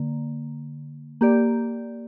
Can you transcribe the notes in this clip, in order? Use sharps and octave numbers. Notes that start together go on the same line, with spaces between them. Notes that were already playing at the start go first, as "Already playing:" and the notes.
Already playing: D3 A#3
A#3 G4 D5